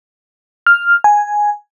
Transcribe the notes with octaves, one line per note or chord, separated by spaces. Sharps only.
F6
G#5